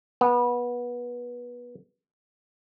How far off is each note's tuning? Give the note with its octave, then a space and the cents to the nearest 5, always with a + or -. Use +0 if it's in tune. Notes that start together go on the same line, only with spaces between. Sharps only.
B3 -20